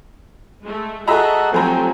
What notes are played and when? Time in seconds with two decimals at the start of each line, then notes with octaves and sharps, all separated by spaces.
0.62 G#3 A3
1.08 F#4 G#4 A4 D#5 E5 F#5 A#5
1.52 F3 F#3 A3 C4 G4 G#5 A#5